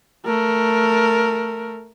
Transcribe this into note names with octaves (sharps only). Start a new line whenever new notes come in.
A3 A#4